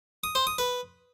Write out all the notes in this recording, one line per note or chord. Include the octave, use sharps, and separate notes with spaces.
D#6
C5
D#6
B4